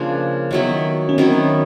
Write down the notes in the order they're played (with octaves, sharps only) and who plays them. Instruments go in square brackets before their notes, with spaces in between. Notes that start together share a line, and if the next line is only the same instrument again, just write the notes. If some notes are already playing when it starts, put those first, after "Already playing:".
Already playing: [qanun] C#3 F3 A#3 D4
D#3 F#3 B3 E4
[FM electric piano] C#4
[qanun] D#3 F#3 B3 E4 [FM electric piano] C4